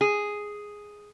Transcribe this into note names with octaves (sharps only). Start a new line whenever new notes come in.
G#4